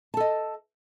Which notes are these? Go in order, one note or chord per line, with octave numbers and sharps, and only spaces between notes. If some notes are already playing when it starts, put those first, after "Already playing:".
A4 D#5 A5